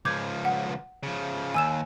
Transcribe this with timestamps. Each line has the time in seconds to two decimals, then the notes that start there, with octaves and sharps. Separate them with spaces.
0.05 C#2 F3 D6 G6 G#6
0.45 F#5
1.03 C#3 F3
1.54 D#2 G#5 E6 E7